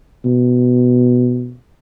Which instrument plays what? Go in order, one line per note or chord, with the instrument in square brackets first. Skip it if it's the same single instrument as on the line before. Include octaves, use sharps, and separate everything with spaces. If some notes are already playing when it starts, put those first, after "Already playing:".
[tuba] B2